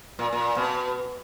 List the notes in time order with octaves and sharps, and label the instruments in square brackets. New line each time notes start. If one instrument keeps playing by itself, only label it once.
[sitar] A#2
A#2
B2